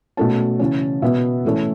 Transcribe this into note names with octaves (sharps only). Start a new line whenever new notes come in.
B2 A3 C#4 A5
C#3 E3 C#4
B2 B3 E5
A2 E3 A3 C#4